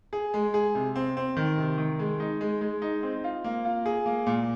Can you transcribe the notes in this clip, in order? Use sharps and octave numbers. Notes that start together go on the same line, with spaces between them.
G#4
G#3
G#4
C3
C4
C4
D#3
C3
D#3
G#3
D#4
G#3
G#3
D#4
C4
F4
A#3
F4
G#4
A#3
A#2